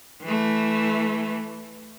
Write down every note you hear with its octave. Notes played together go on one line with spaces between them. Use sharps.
E3 A3